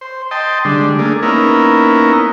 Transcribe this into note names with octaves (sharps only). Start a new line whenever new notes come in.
C5
D#5 G5 A5 C6
D3 G3 G#3 D4
A3 A#3 D4 G#4
A#3 B3 C#4 D#4 E4 A#4